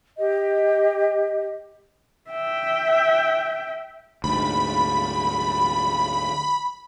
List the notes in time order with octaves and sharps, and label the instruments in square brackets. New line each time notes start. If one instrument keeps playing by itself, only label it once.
[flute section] G4 D#5
[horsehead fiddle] E5 G5
[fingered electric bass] D2 G#2 [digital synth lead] B5